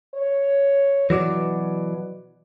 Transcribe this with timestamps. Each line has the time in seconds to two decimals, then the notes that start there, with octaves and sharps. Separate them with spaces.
0.15 C#5
1.10 B2 E3 F#3 D5